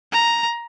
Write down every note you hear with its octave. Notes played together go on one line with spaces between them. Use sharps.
A#5